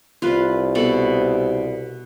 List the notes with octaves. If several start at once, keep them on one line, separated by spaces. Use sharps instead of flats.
C2 F4 B4
B2 A4 B5